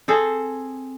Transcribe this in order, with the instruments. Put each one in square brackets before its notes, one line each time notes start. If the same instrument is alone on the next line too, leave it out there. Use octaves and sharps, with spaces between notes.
[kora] C4 G#4 A4